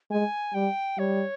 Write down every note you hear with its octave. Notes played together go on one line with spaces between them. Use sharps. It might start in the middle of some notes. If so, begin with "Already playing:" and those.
G#3 G#5
G3 G5
G3 C#5